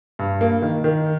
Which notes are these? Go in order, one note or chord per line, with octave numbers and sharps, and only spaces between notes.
G2
A#3
D#3
D#3